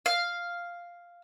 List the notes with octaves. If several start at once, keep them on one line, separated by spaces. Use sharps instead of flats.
F5